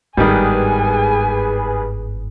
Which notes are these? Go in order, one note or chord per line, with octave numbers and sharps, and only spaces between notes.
G1 G#2 D#3 G3 G#4 B4 G#5